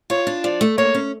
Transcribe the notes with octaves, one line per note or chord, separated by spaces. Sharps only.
F4 C#5
D4
F3 D5
A3
A#3 C#5
C#4